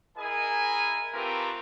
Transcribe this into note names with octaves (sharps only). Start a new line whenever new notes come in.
E4 G#4 A#4 D#5 G#5
A3 C4 F4 G4 A#4 B4